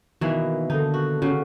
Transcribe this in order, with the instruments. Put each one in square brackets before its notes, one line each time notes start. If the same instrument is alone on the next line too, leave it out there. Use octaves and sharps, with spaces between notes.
[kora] B2 E3 A#3 [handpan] D#3
[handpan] D3 A4 [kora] D#4
[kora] F#4
[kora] C#3 [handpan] F#4